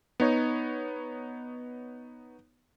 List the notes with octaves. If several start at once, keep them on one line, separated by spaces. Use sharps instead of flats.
B3 D#4 C#5